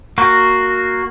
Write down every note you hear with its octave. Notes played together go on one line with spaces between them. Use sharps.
A#3 F#4